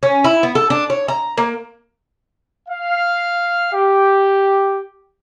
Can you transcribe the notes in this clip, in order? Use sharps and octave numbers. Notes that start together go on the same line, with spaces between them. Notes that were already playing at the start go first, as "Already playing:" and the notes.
C#4
E4
B3
A4
D4
C#5
A#5
A#3
F5
G4